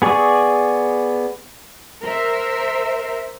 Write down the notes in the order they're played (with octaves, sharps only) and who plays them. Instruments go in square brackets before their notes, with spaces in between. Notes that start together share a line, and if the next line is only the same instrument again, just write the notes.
[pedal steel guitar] B3 G#4 D5 C#6 D#6
[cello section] A#4 C5 E5